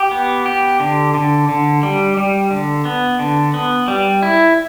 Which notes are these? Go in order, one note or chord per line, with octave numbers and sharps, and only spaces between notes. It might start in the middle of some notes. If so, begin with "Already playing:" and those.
Already playing: G4
B3
G4
D3
D3
D3
G3
G3
D3
B3
D3
B3
G3
E4